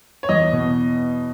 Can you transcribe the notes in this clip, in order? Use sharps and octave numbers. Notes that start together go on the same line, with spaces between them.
C#5
E2 D#5
B2